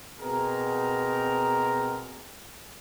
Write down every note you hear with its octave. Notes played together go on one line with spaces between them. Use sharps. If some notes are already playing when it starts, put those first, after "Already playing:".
B2 C4 G#4 A#4 A#5